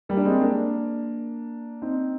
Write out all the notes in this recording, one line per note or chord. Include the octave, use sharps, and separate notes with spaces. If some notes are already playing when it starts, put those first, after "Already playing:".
G3 A#3
D4
G#3 C4
A#3 D4
C4 D#4